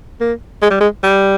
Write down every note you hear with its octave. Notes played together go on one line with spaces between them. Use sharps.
A#3
G#3
G3
G#3
G3